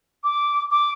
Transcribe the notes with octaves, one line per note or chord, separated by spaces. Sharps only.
D6
D6